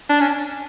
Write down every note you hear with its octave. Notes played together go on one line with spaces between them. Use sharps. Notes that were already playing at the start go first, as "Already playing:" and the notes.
D4
C#4